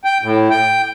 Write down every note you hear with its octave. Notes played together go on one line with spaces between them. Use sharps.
G5
A2
G5